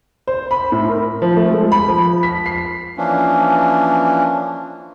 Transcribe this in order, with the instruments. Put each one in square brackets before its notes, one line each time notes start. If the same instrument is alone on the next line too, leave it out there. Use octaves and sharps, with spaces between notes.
[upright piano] C5
B5
A2
A#4
F3
A3
G#3
B5
F3
B6
C7
[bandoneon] E3 F3 A#3 C#4 D4